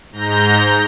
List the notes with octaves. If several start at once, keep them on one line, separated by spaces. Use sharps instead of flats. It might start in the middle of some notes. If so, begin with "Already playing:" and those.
G#2 A#5 G6 A#6